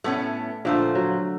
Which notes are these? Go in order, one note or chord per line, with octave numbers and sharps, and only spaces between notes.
A2 A3 B3 C#4
A#2 D3 F3 A3 C5
F#3